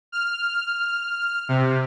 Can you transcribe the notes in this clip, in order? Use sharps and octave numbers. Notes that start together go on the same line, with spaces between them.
F6
C3